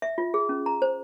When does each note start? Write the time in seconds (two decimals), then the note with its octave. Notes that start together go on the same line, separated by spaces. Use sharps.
0.02 E5
0.18 F4
0.34 G#4
0.49 C#4
0.66 A#5
0.82 C5